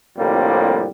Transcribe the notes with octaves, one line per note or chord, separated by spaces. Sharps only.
C2 F2 A2 D3 G3 A#3